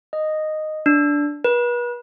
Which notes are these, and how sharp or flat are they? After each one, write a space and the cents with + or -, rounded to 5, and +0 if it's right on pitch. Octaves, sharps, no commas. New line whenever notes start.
D#5 -5
D4 -10
B4 -35